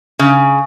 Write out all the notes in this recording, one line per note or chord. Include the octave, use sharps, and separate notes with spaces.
C#3